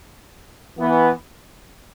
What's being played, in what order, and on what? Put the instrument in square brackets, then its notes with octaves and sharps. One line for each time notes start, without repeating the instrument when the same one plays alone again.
[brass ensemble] E3 B3